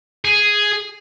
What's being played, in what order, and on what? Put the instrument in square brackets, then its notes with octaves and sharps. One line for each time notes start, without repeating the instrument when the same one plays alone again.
[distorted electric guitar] G#4